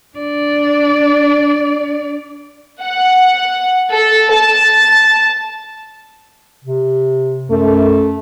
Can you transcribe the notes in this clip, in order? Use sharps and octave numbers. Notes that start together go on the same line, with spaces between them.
D4 D5
F#5
A4
A5
C3
F#2 A3